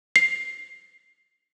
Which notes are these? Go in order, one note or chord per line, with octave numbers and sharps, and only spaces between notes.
C7